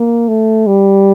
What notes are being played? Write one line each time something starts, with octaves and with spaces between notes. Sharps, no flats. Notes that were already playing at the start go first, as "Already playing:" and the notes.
Already playing: A#3
A3
G3